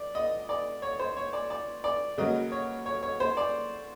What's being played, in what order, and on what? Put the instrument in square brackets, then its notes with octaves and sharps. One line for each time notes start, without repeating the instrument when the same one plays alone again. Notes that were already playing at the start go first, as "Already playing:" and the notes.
Already playing: [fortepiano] D5
D#5
D5
C#5
C5
C#5
D5
D5
D5
C#3 F#3 A#3 D#5
C#5
C#5
C#5
C5
D5